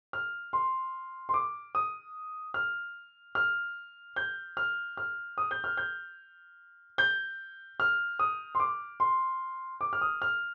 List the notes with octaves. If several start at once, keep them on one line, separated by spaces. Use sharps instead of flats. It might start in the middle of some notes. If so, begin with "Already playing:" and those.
F6
C6
C6
D6
D#6
F6
F6
G6
F6
F6
D#6
G6
F6
G6
G6
F6
D#6
C6
D6
C6
D6
F6
D#6
F6